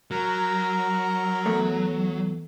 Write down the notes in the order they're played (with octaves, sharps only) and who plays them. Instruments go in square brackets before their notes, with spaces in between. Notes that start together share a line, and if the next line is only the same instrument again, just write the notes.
[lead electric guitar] F#3 [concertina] A#4
[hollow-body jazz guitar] E2 A3